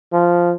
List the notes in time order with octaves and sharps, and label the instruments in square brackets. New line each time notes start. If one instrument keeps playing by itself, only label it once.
[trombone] F3